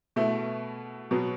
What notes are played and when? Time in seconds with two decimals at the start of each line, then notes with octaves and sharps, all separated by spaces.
0.16 B2 A3 E4
1.11 B2 F#3 B3